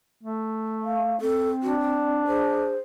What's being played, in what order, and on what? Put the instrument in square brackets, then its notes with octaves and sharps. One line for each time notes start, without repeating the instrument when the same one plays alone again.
[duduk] A3
[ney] F5
[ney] C4 [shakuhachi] A4
[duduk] D4 [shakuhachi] F#4
[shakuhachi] D5
[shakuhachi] G#4 [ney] C5